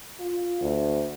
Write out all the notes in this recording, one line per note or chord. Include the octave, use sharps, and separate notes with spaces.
F4
D2